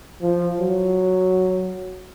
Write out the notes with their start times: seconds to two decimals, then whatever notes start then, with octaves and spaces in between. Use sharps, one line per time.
0.22 F3
0.59 F#3